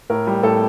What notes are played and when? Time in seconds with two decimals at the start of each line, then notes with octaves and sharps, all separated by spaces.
0.10 A2 A#4
0.27 G3
0.43 A2 A4